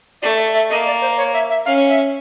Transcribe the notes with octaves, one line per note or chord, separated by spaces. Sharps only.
A3 D5
E5
A#3 D#5
D5
C5
C#5
E5
E5
C#4 F5
E5